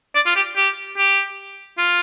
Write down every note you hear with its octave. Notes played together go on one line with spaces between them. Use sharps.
D5
F4
G4
G4
G4
F4